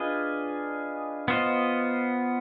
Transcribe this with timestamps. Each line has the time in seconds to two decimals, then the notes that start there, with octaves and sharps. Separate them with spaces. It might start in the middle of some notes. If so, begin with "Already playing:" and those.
Already playing: D4 F4 G#4 B4 D#5
1.28 B3 F4 C5 D#5